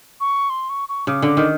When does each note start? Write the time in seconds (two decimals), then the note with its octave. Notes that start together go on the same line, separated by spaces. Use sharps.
0.20 C#6
0.50 C6
0.69 C#6
0.89 C#6
1.07 C#3 D6
1.22 D3 D6
1.37 D#3